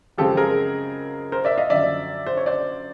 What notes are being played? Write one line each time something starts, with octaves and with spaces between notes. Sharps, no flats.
F#2 C#3 F3 G#3 C4 G4 A4
G#4 A#4
A#4 C5
D5 E5
D#5 F5
F#2 D3 F3 D5 E5
C5
C#5
C5 D5